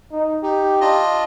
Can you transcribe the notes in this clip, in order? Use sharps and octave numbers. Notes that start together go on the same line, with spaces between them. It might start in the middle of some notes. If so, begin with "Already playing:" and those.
D#4
D#4 G4
D4 F4 D#5